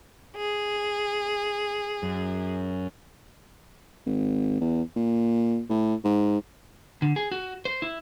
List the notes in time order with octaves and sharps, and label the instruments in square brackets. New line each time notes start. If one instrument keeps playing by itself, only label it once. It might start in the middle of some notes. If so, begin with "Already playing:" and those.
[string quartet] G#4
[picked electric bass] F#2
[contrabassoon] G#1
E2
A#2
A2
G#2
[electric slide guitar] D3
G#4
F#4
C5
E4